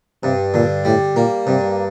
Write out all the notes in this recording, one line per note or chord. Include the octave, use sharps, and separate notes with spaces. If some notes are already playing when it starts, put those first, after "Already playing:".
G2 C3
A#2 D3
A2 G3
A#2 A#3
G2 C3